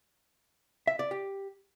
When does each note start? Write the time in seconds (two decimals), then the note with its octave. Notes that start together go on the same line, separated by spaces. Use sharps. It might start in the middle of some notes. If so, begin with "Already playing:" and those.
0.87 E5
0.99 D5
1.11 G4